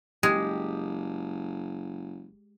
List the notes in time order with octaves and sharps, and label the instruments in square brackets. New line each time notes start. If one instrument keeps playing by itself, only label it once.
[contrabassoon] F#1 [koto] G#3 [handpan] G4